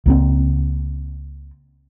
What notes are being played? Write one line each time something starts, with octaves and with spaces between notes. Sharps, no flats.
C#2 A#3 C4